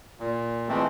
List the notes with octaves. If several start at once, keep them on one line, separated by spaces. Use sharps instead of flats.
A#2
E3 F3 G#3 A3 C4